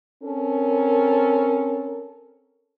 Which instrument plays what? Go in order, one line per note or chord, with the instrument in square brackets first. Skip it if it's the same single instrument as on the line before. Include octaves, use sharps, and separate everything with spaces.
[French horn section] C4 C#4 A4 A#4